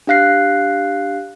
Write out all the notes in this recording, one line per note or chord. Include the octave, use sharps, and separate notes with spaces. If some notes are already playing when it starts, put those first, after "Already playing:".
D4 G4 F5 F#6 C7